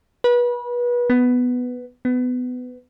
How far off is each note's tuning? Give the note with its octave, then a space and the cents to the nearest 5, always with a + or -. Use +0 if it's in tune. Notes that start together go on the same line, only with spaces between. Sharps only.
B4 -30
B3 +5
B3 +20